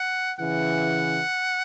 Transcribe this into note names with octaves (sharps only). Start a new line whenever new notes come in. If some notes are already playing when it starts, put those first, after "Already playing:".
Already playing: F#5
C#3 E3 F#5